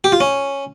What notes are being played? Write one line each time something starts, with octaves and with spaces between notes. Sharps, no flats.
G4
F4
C#4